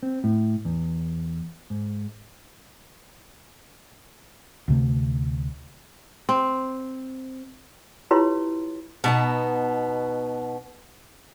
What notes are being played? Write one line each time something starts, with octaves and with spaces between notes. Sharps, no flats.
C4
A2
E2
G#2
D2 C3 A3
C4
E4 F4 G4 B4 C#5 C6
B2 B3 D#4 A5